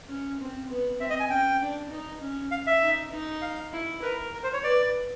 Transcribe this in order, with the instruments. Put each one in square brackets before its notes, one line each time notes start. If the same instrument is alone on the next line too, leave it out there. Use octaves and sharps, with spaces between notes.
[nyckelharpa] C#4
C4
B3
[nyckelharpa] C4 [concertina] E5
[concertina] D#5
G#5
[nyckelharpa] C#4 [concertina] G5
[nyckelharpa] D4
D#4
C#4
[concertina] F5
E5
[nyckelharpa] D#4
D#4
[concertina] F5
[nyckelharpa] E4
[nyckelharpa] A#4 [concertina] B4
[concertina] A#4
C5
C#5
[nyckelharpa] B4 [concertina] D5